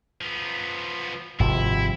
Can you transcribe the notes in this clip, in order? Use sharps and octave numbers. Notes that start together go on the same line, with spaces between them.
F3 B3
G#1 C3 F3 E4